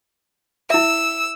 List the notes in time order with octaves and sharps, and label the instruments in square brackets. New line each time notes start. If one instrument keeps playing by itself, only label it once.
[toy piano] E4 E5 [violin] E6